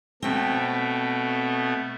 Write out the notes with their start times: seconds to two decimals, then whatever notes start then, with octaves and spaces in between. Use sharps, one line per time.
0.22 B2 A3 C4 G5